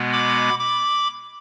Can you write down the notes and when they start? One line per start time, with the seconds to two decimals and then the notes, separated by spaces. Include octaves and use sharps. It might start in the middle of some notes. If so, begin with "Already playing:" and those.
Already playing: B2 G#3 B3
0.12 B5 D6
0.59 B5 D6